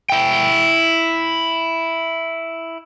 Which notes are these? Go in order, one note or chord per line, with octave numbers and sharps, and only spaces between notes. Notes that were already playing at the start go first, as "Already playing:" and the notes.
E4 G5